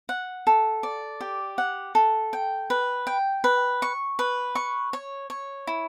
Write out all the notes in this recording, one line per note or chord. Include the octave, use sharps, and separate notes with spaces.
F#5
A4
D5
G4
F#5
A4
G5
B4
G5
B4
C#6
B4
C#6
C#5
C#5
E4